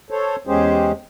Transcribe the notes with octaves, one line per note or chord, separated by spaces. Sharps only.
A4 C5 C#5
E2 G#3 C#4 G4 G#4 C5